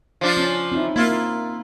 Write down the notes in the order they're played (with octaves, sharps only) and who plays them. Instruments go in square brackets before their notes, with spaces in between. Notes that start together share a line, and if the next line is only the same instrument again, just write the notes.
[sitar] F3 D4 F4
[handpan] C#4
C4 D#4 E4
[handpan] A#3 [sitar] E4 F4